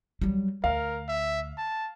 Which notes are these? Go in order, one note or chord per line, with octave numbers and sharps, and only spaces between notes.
F#3 G3
D2 A#4 F5
E5
A5